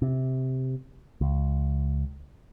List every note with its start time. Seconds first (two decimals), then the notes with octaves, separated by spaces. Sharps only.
0.02 C3
1.21 C#2